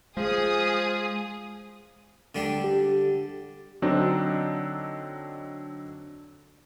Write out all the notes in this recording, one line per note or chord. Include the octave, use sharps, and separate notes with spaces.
F3 G#3 G#4 D#6
D3 G3 D4
G4
D3 F#3 C4 D4 D#4